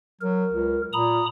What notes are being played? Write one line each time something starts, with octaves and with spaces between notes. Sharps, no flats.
F#3 A#4
C#2
A#2 A#5 B5 D#6